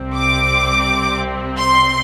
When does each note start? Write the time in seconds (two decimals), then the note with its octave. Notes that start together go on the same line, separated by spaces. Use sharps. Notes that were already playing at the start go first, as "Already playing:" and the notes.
Already playing: C2 C3 G3 C4
0.16 D6
1.58 C6